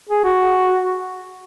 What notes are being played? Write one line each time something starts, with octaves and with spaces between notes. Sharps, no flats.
G#4
F#4